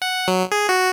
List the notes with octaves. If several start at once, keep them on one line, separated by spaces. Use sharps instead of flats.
F#5
F#3
G#4
F#4